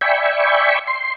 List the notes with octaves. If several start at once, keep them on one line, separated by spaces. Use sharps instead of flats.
D5 E5 G5 G#5 B5 C#6
C6